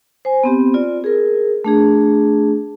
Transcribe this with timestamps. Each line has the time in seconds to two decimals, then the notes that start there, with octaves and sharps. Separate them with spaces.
0.25 C5 G#5
0.44 B3 C4 G4
0.74 F4 D5
1.04 G#4 A#4
1.64 A3 D4 G#4